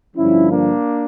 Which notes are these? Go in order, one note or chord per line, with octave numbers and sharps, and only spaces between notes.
G2 D3 F3 C#4 E4
A#3 D4